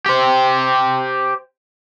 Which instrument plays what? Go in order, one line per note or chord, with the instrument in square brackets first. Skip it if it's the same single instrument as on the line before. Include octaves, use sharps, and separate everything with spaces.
[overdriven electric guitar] G4 C5